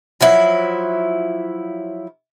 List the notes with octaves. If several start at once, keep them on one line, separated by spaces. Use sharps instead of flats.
F3 F#3 E4